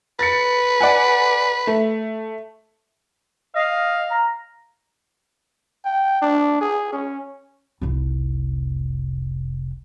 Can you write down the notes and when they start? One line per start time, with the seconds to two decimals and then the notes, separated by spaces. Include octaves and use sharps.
0.19 B4 A6 C#7
0.81 D5 F#5 G#5
1.67 A3
3.56 D#5 F5
4.11 A#5
5.85 G5
6.22 D4
6.61 G#4
6.92 C#4
7.81 F1 C2